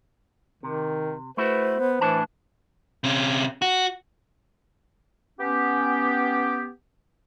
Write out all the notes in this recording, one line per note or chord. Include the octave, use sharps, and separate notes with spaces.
C3 D#3
A3 E4 F#4 B4 C5
B3
A2 E3 D4 A5
C3 C#4
F#4
B3 C#4 G4